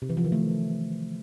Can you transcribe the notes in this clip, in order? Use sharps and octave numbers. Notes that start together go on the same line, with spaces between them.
C3
E3
F3
D#3
A3